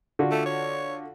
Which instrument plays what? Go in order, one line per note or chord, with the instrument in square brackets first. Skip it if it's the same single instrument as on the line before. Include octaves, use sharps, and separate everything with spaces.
[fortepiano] D3 F4 F#4
[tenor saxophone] A3
C#5